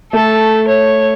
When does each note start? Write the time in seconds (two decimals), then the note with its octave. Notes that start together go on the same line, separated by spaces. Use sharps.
0.13 A3 A4
0.68 C#5